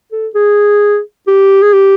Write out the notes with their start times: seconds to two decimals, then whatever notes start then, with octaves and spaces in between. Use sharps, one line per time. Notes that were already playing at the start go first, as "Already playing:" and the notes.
0.12 A4
0.35 G#4
1.27 G4
1.62 G#4
1.73 G4